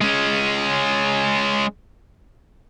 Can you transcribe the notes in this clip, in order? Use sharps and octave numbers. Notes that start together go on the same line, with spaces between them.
G#3 C#4